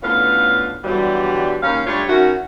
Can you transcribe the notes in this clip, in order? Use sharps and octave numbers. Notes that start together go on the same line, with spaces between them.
A2 D3 B3 C#4 F4 F5
B2 D3 E3 F#3 G3
D#2 D#3 C#4 F5
G3 A3 D4 F4 C#5
D#3 C#4 E4 F#4